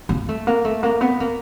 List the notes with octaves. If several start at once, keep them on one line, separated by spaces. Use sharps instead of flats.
A#3
A3
A#3
A3
A#3
B3
A#3